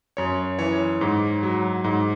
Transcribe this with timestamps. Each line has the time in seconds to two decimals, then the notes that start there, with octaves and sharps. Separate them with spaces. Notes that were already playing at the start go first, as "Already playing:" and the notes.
0.17 F#2 C#5
0.59 E3 C#5
1.01 G#2
1.43 F#3
1.84 G#2